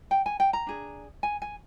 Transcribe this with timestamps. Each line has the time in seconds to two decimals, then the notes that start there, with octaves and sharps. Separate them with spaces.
0.11 G5
0.26 G#5
0.40 G5
0.53 A#5
0.67 D4 G#4
1.23 G#5
1.42 G#5